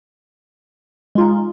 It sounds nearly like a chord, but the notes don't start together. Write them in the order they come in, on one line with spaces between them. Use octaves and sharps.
G#3 F4 D#4